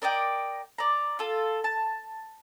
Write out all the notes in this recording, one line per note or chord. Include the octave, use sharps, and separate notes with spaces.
A#4 D5 D#5 G5
D5 A#5
F4 A4
A5